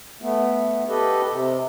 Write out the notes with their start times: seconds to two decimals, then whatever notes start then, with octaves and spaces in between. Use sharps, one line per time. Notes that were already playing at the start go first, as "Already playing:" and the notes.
0.22 A3 B3
0.89 G4 A4 B4 D#5
1.31 C3